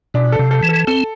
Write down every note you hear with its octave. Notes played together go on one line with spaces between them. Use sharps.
B2 D4
A4
C3
A4
E3
A4
C4 A4